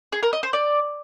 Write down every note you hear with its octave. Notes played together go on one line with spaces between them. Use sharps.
G#4
A#4
D#5
C5
D5